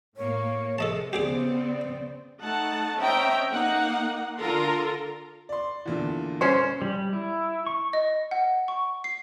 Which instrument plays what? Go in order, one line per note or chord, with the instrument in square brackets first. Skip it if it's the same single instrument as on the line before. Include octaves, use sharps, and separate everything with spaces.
[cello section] A2 A#3 [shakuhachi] C#5
[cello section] C3 [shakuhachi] G#4 [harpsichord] A4 D#5 A5
[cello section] C#3 B3 C4 [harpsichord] G4 G#4 D6 [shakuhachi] D5
[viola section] A3 D#4 F#5 A5
C4 C#4 D#5 E5 G5 A#5
A#3 D#4 F#5
D3 F4 A4 A#4 A#5 C6
[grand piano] D5 C6
E2 A#2 D3
[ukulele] C#4 C5 [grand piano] F6 C#7
[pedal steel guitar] G3
E4
C#6
[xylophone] D#5
F#5
C#6
C7